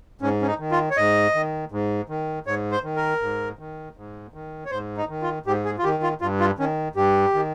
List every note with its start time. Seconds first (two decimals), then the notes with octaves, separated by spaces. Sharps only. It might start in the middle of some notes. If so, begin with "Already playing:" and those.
0.21 G#2 C#4
0.42 C#4
0.47 D#4
0.59 D#3
0.71 F4
0.90 C#5
0.97 G#2 D#5
1.35 D#3
1.72 G#2
2.09 D#3
2.47 G#2 C#5
2.72 C5
2.84 D#3
2.96 A#4
3.22 G#2
3.59 D#3
3.97 G#2
4.34 D#3
4.66 C#5
4.71 G#2 C5
4.97 D#4
5.09 D#3
5.22 F4
5.46 G#2 G4
5.65 G#4
5.78 F4
5.84 D#3 G4
6.03 F4
6.21 G2 F4
6.40 F4
6.58 D#3 C#4
6.96 G2 G4
7.34 D#3